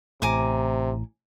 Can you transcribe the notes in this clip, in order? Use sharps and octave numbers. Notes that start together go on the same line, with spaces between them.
A1 A2 C3 G#5 A#5 D6